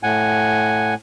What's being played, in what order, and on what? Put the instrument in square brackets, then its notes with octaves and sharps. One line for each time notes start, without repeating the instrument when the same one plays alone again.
[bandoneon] A2 F#5 G#5